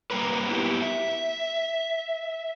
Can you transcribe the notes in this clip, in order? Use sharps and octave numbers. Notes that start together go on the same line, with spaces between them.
G3 A#3 A#4 B4
B3 E4 G4
E5